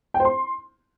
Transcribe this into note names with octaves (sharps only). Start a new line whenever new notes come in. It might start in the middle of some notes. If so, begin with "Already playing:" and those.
G5
C5
C6